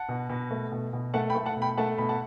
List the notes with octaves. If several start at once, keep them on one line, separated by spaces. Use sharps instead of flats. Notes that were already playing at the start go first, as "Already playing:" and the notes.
Already playing: F#5 A5
B2
B2
A3
B2
B2
A3 F#5 A5
G5 B5
A3
F#5 A5
B2
G5 B5
A3 F#5 A5
B2 B5
F#5 A5